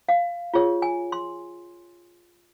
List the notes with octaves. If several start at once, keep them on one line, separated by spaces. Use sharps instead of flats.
F5
F4 G#4 C#5
G#5
C6